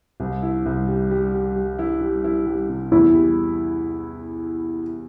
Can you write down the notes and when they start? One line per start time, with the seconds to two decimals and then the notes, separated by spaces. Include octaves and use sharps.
0.20 C2
0.42 E4
0.66 C2
0.88 G3
1.11 G3
1.34 G3
1.56 G3
1.79 E4
2.01 G3
2.24 E4
2.46 G3
2.69 C3
2.92 E2 E4
3.15 G3